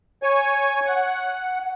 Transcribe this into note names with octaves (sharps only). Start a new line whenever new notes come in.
C#5 G#5
F#5